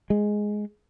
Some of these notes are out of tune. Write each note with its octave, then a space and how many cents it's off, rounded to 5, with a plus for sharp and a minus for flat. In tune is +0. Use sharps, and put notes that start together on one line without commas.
G#3 +5